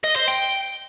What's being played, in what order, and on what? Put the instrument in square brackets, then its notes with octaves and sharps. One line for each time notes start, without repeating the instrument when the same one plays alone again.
[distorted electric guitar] D#5
C5
G5